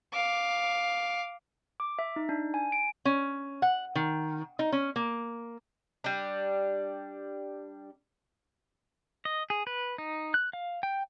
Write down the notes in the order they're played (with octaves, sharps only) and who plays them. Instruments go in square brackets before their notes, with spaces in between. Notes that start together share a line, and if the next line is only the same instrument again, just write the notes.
[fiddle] F5 D6
[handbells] D6
E5
D#4
D4
G#5
D7
[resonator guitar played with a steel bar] C#4
F#5
D#3
D#4
C#4
A#3
[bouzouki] G3 D4
[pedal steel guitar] D#5
G#4
B4
D#4
F#6
F5
G5